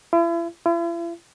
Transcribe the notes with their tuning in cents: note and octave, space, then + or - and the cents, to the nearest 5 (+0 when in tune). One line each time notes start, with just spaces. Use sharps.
E4 +40
E4 +45